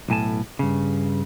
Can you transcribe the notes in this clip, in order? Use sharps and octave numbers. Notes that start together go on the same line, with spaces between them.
B1 A2 G#5 A5
G2 C#3